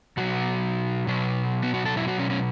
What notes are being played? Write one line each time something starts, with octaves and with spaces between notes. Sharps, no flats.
B2 F#3 F#4
B2 F#3
B3
F#4
A4
B2 F#3 E4
F#4
C#4
C#4